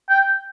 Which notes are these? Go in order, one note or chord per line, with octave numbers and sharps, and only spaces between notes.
G5